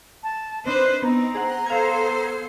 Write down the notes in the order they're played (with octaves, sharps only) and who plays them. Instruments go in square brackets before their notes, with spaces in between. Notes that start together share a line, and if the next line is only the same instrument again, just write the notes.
[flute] A5
[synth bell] C4 D4 [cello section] D#4 B4 C5 [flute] F#6
[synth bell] B3 [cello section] C4 D#4 [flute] A#5
[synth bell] G#4 C5 F#5
[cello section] B3 A4 C5 [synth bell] F5 G#6